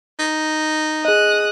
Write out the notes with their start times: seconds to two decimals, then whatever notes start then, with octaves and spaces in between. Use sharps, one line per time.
0.19 D#4
1.05 G#4 D#5 D#6 F#6